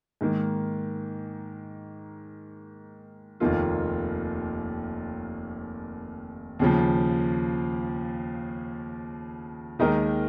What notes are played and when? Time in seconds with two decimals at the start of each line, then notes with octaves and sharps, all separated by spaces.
0.21 G#2 D#3 A#3
3.40 F1 D#2 D#3 A#3 F4
6.59 D#2 C#3 F3
9.79 D#2 D#3 G#3 D#4 A#4